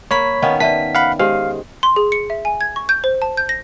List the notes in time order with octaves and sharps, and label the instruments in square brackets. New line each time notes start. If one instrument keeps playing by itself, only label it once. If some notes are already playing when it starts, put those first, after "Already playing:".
[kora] A#3 [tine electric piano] C#5 B5 B6
[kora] D#3 B3 C#4 [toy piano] D#5 F5
[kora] B4 [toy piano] D5 E5 A5 [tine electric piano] B6
[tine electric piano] F5 F#5 B5
[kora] G#3 [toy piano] G4 C5 C#5 [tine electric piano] F5
[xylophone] C6
G#4
C#7
E5
G#5
G#6
C#6
G6
C5
A5
G6
A#6